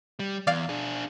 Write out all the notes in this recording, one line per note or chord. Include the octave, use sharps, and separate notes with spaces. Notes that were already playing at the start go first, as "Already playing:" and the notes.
G3
E2 D5 F5
D4 G#4